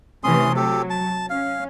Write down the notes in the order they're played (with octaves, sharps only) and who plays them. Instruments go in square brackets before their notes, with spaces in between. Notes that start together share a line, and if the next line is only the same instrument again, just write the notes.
[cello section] C3 E3 A3 [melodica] C#4 C6 D#6
[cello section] F#3 [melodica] G4 A4
[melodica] A5
[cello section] C#4 [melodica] F5